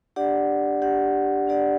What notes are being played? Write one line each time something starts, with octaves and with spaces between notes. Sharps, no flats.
D4 G4 D5 F#5
D4 G4 D5 F#5
D4 G4 D5 F#5